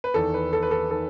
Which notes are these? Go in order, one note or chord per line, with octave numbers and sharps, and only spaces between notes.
B4
E2 D#3 A4
B4
A4
B4
A4
D#3 A4